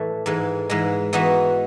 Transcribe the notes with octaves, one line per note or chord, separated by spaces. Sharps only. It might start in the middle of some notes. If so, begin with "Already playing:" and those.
Already playing: A2 E3 A3
G#2 E3 G#3
G#2 E3 G#3
E3 B3 D#4 F#4